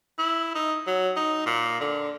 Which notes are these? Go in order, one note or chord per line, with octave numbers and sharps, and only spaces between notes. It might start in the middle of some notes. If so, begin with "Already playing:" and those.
E4
D#4
F#3
D#4
A#2
D3